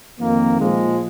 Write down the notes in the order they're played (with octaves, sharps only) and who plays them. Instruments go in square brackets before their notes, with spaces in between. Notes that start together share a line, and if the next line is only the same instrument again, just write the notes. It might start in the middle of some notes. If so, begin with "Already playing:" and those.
[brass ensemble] F2 D#3 A#3
A#2 F3 G#3